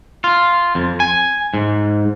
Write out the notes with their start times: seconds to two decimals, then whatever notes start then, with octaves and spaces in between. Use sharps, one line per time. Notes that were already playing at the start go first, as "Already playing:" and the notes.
0.24 F4
0.75 F2
1.00 G#5
1.54 G#2